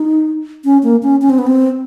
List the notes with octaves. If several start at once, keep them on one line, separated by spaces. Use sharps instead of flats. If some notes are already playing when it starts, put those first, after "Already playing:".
Already playing: D#4
C#4
A#3
C#4
C#4
C4
B3
C4